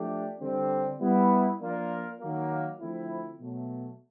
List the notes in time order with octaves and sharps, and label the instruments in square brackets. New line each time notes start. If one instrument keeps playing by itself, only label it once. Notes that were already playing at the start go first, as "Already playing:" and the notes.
Already playing: [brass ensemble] F3 A3 D4 G4
D3 G3 C4
G3 B3 E4
F3 A#3 D4 F4 A#4
D#3 F#3 A#3
D3 F3 A3 C4 E4
B2 F#3 A3